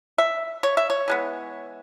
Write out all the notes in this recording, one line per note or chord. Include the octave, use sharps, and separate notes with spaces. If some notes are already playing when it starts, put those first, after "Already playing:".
E5
C#5
E5
C#5
E3 G#3 B3